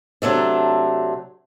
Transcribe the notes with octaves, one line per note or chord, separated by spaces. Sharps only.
C3 F#3 A3 D4